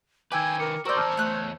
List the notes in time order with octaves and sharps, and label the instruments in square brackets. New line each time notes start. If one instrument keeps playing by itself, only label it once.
[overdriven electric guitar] D#3 B4 [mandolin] G5 [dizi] G#5 [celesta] D6 E6 G#6
[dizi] A#4 [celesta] D6 C#7
[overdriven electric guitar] F#4 C6 [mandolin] A#4 D5 [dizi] C5 [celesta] C#6 E6 G6
[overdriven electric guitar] E2 C#5 [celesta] A5 E6 F6
[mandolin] A3 F#6